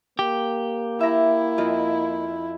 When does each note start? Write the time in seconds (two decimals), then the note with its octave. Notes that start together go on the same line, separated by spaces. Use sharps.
0.19 A#3 G4
1.01 E4 E5 A#5
1.58 F2 F4 D#5